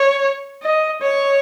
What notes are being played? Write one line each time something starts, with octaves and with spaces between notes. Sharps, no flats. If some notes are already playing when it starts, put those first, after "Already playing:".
Already playing: C#5
D#5
C#5